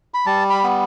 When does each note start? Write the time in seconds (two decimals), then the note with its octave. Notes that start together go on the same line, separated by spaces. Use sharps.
0.14 B5
0.26 G3 A5
0.50 B5
0.64 B3